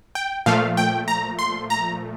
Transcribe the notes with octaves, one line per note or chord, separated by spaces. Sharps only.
G5
A#2 F3 A3 F5
G5
A#5
C6
A#5